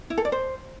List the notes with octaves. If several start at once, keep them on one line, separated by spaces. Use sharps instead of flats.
E4
A4
D5
C5